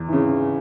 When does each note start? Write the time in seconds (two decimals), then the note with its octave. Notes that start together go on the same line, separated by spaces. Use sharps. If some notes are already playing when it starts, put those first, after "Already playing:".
Already playing: E2
0.09 C#3 E3